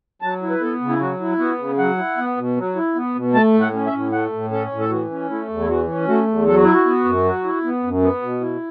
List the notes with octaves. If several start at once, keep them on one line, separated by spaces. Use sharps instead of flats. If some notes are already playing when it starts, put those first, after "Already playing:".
F#3 A5
E4
B4
B3 A4
C#3
E4
F#3 F#4
E4
B3 F#4
C#3
F#3 F#5
E4
B3
B2
F#3
E4
B3
B2
A3 A5
A2
F#5
C#4
E5
A2
A3 F#5
A2
C#4 A4
A2
A4
E3 F#4
C#4
A3 E4
E2
E4
E3 F#4
C#4
A3 F#4
E2
F#3 A4
F#4
E4
F#4
B3
F#2
F#3
E4
B3
F#2
B3
B2
E4